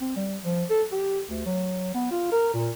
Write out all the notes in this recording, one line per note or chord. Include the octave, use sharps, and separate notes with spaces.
C4
G3
F3
A4
G4
D2
F#3
B3
F4
A#4
A#2